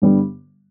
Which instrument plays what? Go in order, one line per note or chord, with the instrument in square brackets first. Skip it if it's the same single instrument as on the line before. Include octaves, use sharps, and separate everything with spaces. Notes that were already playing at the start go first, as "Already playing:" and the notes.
[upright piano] G2 D3 G3 B3